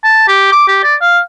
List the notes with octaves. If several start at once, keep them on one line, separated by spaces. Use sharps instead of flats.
A5
G4
D6
G4
D5
F5